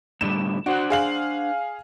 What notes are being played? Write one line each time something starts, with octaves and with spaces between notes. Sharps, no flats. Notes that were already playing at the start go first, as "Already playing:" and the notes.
A2 D3 G3 E7
D4 F#4 C5 F#5
G#4 F5 F#7